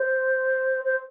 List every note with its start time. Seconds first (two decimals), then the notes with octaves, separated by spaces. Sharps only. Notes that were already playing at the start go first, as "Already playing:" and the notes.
Already playing: C5
0.84 C5